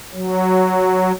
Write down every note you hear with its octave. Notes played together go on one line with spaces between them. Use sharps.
F#3